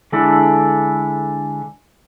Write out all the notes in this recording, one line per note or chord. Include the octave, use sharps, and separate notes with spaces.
D3 G#3 D4 E4 A4